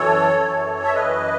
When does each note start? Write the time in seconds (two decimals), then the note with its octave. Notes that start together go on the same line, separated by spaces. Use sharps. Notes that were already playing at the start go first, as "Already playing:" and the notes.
Already playing: F#2 E3 A4 C#5
0.40 F#2 E3
0.84 E5
0.94 F#2 E3 B4 D#5